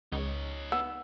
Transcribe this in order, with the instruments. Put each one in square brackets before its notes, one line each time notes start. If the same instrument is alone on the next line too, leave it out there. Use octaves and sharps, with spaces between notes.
[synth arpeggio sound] C#2 [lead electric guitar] D#4 C#5
[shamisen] B3 [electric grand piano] E6